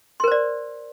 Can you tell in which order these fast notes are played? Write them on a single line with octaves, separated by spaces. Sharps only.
C6 A#4 C5 D5